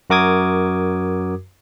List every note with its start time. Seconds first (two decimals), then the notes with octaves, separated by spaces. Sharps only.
0.10 F#2 F#4 A#4 D6 D#6 G#6